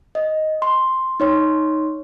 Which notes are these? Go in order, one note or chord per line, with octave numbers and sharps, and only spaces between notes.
D#5
C6
D#4 C#5 C6